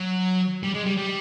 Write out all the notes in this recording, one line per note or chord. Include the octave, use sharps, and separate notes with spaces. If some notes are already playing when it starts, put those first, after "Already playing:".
Already playing: F#3
G3
G#3
G3
G3